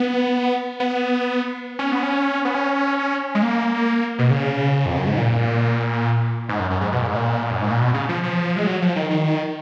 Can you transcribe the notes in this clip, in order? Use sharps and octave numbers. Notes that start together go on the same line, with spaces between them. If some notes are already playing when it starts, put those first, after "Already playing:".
Already playing: B3
B3
C#4
B3
C#4
B3
C#4
G#3
A#3
B2
C#3
F2
F#2
G#2
A#2
G#2
F#2
F#2
G#2
B2
A#2
G#2
A#2
F#2
G#2
A#2
B2
C#3
F3
F3
G#3
F#3
F3
D#3
D#3